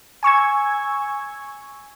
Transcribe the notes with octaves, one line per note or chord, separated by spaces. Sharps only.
G#5 C#6 E6 G#6